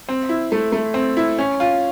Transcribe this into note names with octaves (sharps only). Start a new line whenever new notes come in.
C4
E4
A3
A3
C4
E4
C#4
F4